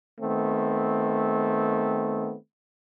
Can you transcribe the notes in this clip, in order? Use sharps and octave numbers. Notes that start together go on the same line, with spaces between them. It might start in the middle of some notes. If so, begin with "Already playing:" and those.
D#3 A3 B3 C4